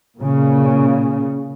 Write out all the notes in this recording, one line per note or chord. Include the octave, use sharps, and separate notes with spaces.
A#2 C#3